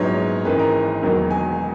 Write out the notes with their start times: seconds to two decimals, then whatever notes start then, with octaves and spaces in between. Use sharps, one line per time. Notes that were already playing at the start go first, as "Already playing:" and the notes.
Already playing: A#1 G#2 F#3 B3 C#5
0.45 G#1 G#2 E3 A#3 C#4 B4
0.59 A#4
1.03 E1 E2 D#3 F#3 A#3
1.30 G#5